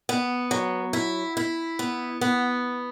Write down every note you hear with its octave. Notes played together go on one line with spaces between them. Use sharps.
B3
F#3
E4
E4
B3
B3